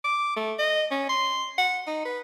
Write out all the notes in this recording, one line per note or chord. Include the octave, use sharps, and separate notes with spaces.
D6
A3
D#5
C#4
C6
F#5
D#4
B4